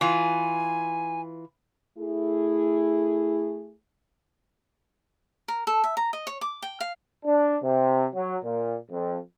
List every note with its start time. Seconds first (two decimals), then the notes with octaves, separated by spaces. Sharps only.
0.01 E3 F4 G#5
1.97 A3 E4 G#4
5.48 A#4
5.67 A4
5.84 E5
5.97 A#5
6.13 D#5
6.27 C#5
6.41 D6
6.62 G5
6.80 F5
7.26 D4
7.62 C3
8.15 F#3
8.44 A#2
8.90 F2